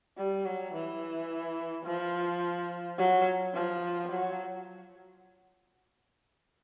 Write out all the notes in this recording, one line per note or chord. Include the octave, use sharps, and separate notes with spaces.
G3
F#3
E3
F3
F#3
F3
F#3